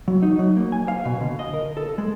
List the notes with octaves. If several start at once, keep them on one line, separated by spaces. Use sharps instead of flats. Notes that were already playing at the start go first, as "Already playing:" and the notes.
F#3
D#4
F#3
A#3
G#5
F5
B2
D3
D#5
A#4
A4
G#3